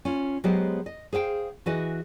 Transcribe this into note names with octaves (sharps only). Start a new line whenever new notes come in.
C#4 F4
F#3 G#3 B3 G4 G#4 C5
D#5
G#4 C5 F5 G5
E3 E4 F#4 G#4 B4 D#5